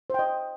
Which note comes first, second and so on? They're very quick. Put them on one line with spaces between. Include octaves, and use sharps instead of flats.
C5 G5 D#5